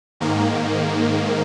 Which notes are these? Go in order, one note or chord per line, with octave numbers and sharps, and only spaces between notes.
G#2 D#3 A#3